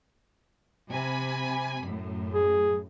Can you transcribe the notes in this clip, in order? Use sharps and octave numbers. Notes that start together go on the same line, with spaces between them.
C3 G#5 B5
F#2 A2
G#4